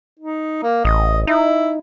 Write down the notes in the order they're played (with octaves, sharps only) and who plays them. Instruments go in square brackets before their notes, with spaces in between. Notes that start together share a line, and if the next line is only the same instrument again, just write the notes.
[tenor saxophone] D#4
A#3
[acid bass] A1 [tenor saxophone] D#5
[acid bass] D#4 [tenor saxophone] E4